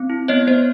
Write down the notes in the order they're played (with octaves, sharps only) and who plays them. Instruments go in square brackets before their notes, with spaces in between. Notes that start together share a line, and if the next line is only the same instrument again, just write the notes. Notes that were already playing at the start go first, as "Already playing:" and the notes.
Already playing: [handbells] C4
E4
B3 C#5 D#5
B3 C5 D5